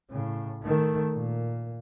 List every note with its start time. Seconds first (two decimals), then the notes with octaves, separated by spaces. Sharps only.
0.10 A2 C#3
0.63 D#3 A3
1.12 A#2